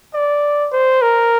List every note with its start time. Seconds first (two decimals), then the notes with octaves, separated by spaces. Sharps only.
0.14 D5
0.72 C5
1.02 A#4